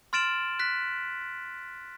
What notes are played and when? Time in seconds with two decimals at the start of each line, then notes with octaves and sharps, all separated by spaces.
0.13 C6 F6 A6 D7 E7 F#7
0.59 F#6 B6